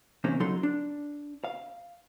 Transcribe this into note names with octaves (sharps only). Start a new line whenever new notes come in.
E2 C3 D#3 A#3 C#4 C5
C#3 F#3 D#4 A4 C6
D4
F5